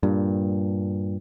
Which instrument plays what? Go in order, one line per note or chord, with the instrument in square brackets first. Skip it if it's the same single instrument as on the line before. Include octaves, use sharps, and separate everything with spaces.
[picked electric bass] G2 A#2